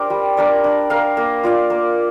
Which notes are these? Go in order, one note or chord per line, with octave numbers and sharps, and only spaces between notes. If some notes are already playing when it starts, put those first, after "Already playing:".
Already playing: D4 G4 A#4 C5 D5
G3
D4 A#4 D5
D4
A#4 F5
A#3
F4 D5 F5
A#3